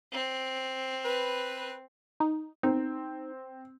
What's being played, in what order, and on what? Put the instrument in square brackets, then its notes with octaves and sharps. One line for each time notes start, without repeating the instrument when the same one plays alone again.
[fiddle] C4
[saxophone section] B4
[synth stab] D#4
[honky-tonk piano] C4 [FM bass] D#4